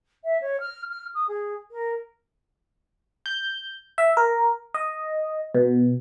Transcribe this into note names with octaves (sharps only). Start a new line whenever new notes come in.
E5
C#5
F6
F6
D#6
G#4
A#4
G6
E5
A#4
D#5
B2